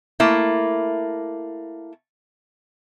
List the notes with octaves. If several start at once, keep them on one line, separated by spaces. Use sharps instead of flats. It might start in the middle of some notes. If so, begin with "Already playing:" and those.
A3 A#3 E4